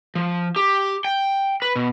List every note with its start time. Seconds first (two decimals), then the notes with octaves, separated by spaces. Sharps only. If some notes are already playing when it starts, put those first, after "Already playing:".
0.15 F3
0.56 G4
1.05 G5
1.62 B4
1.76 B2